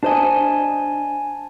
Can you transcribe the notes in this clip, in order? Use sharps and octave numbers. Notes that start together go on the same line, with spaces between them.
D4 C5 D#5 G#5 A5